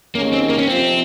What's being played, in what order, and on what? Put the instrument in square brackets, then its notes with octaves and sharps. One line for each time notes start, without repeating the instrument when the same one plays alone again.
[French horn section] D#2 D#3 G#3 C#4 [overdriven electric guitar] A#3
[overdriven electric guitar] C4
A#3
C#4
[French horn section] F2 C3 F3 [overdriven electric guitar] C4